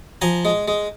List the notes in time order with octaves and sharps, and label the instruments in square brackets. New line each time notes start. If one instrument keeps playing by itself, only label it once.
[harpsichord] F3 G#5 A#5
G#3
G#3